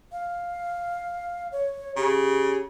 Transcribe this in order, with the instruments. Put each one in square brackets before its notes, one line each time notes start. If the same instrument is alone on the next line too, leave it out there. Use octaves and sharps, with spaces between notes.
[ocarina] F5
C#5
[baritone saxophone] C#3 [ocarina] G4